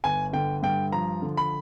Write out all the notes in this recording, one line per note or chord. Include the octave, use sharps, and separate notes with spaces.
G1 G#5
D3 G5
G2 G5
F3 A#5
D3
B5